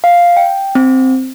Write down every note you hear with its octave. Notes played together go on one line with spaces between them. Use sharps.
F5
G5
C4